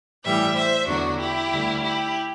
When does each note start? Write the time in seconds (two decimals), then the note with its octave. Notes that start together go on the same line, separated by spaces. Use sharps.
0.24 A2 E3 G3 E5 G5
0.56 C5 E5
0.87 E2 D3 F#3 D4 F#4
1.20 E4 G4
1.52 D2 D3 G3
1.83 E4 G4